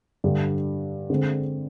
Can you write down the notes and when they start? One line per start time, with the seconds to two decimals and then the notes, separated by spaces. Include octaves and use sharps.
0.24 G2 D3 G3
1.10 D3 G#3 C4